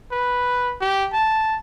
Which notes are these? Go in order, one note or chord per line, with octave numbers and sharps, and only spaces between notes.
B4
G4
A5